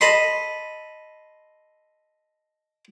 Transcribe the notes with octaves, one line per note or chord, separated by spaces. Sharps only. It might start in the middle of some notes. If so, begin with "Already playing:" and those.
A4 D#5 B5 C6